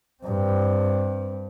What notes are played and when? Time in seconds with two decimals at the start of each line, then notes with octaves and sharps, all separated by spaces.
0.23 G2 C4